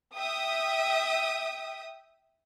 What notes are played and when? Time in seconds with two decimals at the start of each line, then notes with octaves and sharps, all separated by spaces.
0.15 E5 G5 D#6